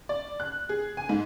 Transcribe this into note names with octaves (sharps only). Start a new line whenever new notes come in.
D5
F#6
G#4
G#5
G#2